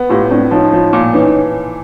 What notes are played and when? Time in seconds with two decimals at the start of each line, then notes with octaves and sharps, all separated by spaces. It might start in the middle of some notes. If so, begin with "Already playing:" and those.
Already playing: B3
0.09 A2 F4 G4
0.30 A2 C4 D4
0.51 F3 C#4 D#4
0.73 F3
0.93 A#2
1.14 E3 C#4 D#4